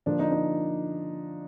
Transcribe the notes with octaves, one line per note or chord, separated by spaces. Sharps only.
D3 F3 A#3 D4
D#4
D#4